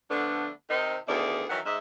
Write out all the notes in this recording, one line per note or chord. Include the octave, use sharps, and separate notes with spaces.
D3 F3 A3 B3 D4
C3 D#3 C4 D#4
D2 B2 D#3 E4 G#4 D5
D#3 E3 F#3 A#4 E5 F#5
G#2 D#5 E5